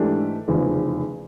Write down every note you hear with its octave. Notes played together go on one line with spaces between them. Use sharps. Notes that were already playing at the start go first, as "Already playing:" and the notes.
Already playing: G#2 E3 A3 D4 G4
F1 E2 C#3 F3